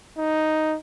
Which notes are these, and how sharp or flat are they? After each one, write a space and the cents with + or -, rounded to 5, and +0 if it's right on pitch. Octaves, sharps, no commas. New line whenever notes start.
D#4 +0